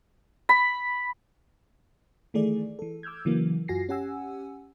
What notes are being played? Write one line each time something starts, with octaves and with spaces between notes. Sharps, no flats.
B5
D#3 E3 A3 G#4 D5
E3 A4
D6 E6 F6 G6 G#6
C#3 E3 F#3 A#3
F#2 F4 F#4 G#5 A#6 C7
C#4 G4 F#5 G#5 E6